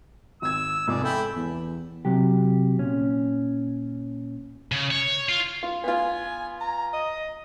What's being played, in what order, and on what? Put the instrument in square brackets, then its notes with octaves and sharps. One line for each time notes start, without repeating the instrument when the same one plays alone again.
[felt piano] G#1 G#6 [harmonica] E6
[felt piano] F1 F2 G#2 [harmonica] G#4 D5
[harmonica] E4 G5 [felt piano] A4 G#5
[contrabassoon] E2
[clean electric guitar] C3 F#3 G4
A#2 C#4
[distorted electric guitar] C#3
C#5
F4
[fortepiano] F4
[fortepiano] B3 F4 [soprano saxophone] G#5
[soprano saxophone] A#5
D#5